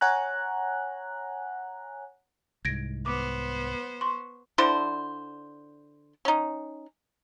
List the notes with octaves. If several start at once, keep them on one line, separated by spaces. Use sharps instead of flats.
C#5 F#5 G#5 A#5 F#6
C2 G#2 G#6 A#6 D7
B3 C5 D6
C6 C#6
D3 D4 E4 C5
C#4 D#4